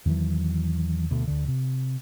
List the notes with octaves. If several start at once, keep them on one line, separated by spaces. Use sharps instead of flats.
E2 D#3 E3 F#3
D2 B2
D2 D3
C3